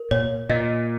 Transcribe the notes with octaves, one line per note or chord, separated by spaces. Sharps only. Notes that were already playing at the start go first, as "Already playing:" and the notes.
Already playing: A#4
A#2 C#5
A#2 D#5